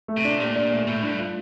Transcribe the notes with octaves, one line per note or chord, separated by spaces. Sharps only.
A3
C3
D4
A#2 G4
D5
A3
A2 A3
G2 D4
F4